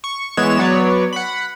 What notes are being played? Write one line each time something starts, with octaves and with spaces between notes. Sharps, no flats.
C#6
E3 G#3 B3 C#5 E7
F#3 B3 C#5 D5
F#5 B5